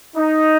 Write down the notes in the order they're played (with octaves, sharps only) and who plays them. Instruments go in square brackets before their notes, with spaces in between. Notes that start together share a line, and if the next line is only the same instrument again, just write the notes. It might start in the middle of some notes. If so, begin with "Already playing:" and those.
[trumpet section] D#4